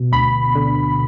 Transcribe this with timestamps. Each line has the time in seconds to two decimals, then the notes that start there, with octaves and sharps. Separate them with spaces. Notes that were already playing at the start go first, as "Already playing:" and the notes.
Already playing: B2
0.12 D2 B5
0.55 D3